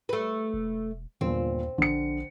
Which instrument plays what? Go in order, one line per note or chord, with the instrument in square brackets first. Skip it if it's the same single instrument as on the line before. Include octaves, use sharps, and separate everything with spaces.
[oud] A3 B4
[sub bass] E1
[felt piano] G1 A#2 [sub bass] D#2 [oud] C4
[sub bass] A#1 [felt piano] D3 C#7